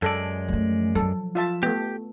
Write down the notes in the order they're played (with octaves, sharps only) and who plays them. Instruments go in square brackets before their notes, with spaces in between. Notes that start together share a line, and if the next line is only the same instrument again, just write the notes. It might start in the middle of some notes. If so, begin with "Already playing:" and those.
[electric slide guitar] F#2 G#3 D5 [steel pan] A4
[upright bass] F3 A3
[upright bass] F3 F#3 [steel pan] A4
[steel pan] F4 E5 A5
[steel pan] A3 B3 [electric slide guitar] G4